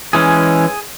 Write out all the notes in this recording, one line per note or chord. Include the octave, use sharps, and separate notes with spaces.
E3 G#3 C#4 G#4